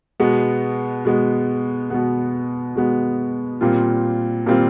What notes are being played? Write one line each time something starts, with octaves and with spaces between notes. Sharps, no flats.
B2 G#3 B3
B2 G#3 B3
B2 G#3 B3
B2 G#3 B3
A#2 G3 C4 F4
A#2 G3 C4 F4